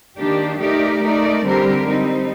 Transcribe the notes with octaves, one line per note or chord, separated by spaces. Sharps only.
D#3 A#3 D4 G4
A3 D#4 G4 A#4 D5
A3 D#4 A#4 D5
D3 G3 C4 G4 A#4
G3 C4 D#4